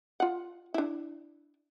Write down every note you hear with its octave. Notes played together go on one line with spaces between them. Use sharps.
F4 F#5
D4 E4